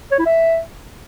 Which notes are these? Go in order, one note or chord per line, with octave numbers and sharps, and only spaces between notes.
C#5
E4
E5